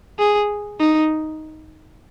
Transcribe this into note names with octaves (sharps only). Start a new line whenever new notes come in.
G#4
D#4